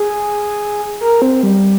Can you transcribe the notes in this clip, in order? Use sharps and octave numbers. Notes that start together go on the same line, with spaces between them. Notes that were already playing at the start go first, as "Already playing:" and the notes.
Already playing: G#4
A#4
C4
G3